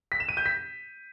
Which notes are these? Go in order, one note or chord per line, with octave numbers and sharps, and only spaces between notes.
B6
E7
D#7
G6
B6